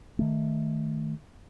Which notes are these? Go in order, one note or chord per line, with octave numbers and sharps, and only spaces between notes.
D#3 A3